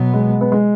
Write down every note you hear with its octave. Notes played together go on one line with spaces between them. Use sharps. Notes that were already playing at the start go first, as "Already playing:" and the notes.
Already playing: B2 F#3 B3
G#3
B3
G#3